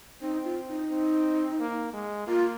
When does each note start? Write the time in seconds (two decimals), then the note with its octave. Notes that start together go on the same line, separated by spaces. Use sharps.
0.21 C4 D#4
0.44 F4
0.67 D#4
0.90 C4
1.60 A#3
1.93 G#3
2.27 A#3 F4